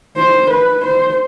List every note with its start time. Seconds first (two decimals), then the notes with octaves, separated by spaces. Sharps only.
0.16 C5
0.50 B4
0.84 C5